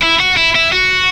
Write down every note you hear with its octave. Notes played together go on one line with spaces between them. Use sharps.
E4
F#4
E4
E4
F#4